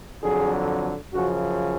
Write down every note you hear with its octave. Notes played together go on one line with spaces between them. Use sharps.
F2 D3 F#3 G#4
F#2 C#3 F3 F#4